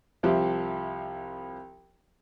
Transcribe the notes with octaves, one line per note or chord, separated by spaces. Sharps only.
C2 F3 G4 E5